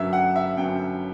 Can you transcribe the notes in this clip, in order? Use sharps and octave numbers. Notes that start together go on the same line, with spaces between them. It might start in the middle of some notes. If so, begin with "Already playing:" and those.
Already playing: G1 F#2 F#3 E5
F#5
E5
G1 F#2 F#3 G5